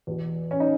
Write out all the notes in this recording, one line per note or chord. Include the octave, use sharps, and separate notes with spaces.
E2 B2
C#4
D#4